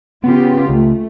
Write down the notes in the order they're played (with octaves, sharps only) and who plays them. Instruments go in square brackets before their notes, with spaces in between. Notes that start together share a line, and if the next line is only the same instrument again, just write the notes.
[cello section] C#3 F4 G4 [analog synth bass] B3
[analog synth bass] C#2 [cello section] A3